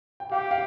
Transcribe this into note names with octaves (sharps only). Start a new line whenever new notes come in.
G5
G4 F5
F5